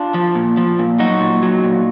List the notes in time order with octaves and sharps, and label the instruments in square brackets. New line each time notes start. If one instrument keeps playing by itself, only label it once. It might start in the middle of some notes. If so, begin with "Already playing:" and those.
Already playing: [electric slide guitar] D4 F4
F3
A#2
F3
A#2
F#3 D#4 F#4
A#2
F#3
A#2